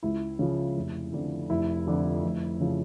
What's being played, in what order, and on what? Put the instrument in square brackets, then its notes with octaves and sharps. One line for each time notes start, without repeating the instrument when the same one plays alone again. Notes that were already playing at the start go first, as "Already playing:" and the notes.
[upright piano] C#2 E4
C#3 F3
F1
F2 D3
F1 E4
F2 D3 F3
F1
C#3 F3